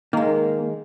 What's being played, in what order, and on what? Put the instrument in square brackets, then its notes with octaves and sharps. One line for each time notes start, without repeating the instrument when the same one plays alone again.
[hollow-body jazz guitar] D#3 G#3 [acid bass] A#3